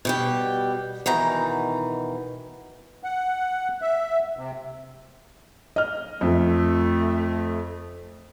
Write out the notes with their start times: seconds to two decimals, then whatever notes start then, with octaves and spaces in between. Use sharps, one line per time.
0.05 B2 G3 G4
1.06 B2 D#3 E3 A#5
3.03 F#5
3.82 E5
4.37 C3
5.76 D#5 F6
6.21 F2 A3